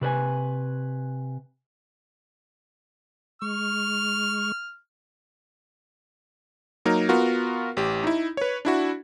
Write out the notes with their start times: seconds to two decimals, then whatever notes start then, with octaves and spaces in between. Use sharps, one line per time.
0.01 C3 B4 C5 G#5
3.42 G#3 C#6 F6
6.85 F#3 A#3 D#4 A#4
7.09 B3 F4 F#4 A#4
7.77 A1 G4
8.03 D#4 E4
8.37 B4 C#5
8.65 D4 E4 F#4